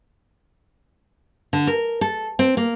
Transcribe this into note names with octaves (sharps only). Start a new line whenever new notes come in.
D3
A#4
A4
C4
A#3